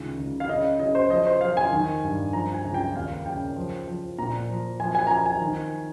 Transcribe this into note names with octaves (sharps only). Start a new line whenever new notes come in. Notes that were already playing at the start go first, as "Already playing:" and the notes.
Already playing: C#2 D#3
C#2
F5
C#3 D#5
C#3 D#5
C5
F3 D#5
C5
F3 F5
G#5
D#3
G2
F3 A#5
G#5
C#2
G5
D#2 F5
C#3 G5
F3
F3
A#2 A#5
F3
F3 G#5
G#5
A#5
F3 G#5
G#5
D#3